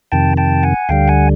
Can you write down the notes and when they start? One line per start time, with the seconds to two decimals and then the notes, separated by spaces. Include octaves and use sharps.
0.12 F2 C3 D#3 G5 A5
0.37 G5 A5
0.63 F#5 G#5
0.89 D2 D3 G3 F5 G5
1.08 F#5 G#5